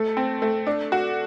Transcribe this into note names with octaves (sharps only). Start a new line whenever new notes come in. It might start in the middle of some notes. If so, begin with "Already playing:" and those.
Already playing: A3 A4
C4
A3
D4
F#4